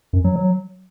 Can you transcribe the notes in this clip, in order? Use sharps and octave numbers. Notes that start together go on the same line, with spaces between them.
F#2
F#3
F#3